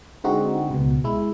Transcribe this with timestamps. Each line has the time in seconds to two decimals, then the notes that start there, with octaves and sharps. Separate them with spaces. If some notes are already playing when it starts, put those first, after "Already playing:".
0.24 D3 G#3 C4 D#4 F#4
0.71 C#2 B2
1.04 G#3 E4